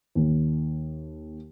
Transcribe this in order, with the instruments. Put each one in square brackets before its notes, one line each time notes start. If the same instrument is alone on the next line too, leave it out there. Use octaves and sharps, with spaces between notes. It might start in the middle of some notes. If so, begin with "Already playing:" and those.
[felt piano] D#2